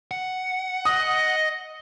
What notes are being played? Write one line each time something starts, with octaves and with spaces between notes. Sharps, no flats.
F#5
D#5 D#6